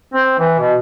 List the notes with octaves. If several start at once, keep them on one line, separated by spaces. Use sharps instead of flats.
C4
E3
B2